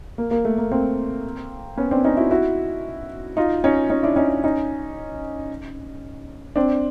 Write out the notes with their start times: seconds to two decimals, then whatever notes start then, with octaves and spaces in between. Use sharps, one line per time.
0.18 A#3
0.31 A#3
0.45 A3
0.58 A#3
0.72 A#3 C4
1.78 B3 C#4
1.91 C4 D4
2.04 C#4 D#4
2.17 E4 F#4
2.31 E4 F#4
3.37 D#4 F4
3.64 C#4 D#4
3.90 C#4 D#4
4.03 D4 E4
4.16 C#4 D#4
4.44 C#4 D#4
6.56 C4 D4